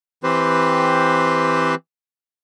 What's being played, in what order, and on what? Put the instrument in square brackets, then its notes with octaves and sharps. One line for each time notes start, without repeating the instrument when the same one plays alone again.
[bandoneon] E3 C4 G4 B4 C5